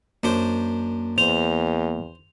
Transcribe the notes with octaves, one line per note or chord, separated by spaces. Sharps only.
F#2 A#3 D4 C5
E2 C5 F7